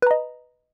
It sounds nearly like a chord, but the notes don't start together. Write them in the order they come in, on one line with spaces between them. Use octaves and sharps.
B4 A#5 D#5